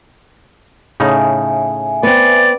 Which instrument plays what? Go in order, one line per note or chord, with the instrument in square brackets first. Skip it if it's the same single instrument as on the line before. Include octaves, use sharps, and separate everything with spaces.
[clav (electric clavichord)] A2 C#3 D#4 [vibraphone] E5 G#5
[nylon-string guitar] B3 C4 [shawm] D5